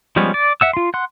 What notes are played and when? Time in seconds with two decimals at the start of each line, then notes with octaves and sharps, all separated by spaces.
0.16 F3 G3 G#3 B3 C#4
0.34 D5
0.61 E5 F#5 E6
0.73 F4 C6
0.94 F#5 C6